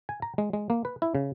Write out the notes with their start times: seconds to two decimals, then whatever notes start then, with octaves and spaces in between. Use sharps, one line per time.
0.09 G#5
0.22 A#5
0.38 G#3
0.53 G#3
0.70 A#3
0.85 B4
1.02 E4
1.15 C#3